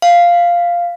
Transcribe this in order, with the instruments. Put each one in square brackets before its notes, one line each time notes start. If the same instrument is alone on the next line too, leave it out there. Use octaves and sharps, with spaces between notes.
[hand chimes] F5